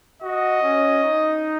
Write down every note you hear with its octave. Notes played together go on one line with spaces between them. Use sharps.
F#4 D#5
C#4
D#4